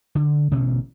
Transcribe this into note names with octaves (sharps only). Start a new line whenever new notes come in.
D3
A1 B2 D3 C#4